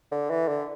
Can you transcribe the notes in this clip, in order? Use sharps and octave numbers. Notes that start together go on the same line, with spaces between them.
D3
E3
D3